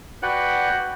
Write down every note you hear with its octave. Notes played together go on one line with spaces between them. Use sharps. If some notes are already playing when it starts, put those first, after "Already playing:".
F#4 B4 D5 F#5 G5 F#6